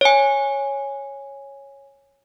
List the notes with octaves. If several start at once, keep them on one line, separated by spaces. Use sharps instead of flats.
C#5 G#5